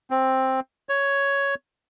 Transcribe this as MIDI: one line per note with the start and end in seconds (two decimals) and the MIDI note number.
0.11 0.60 60
0.89 1.55 73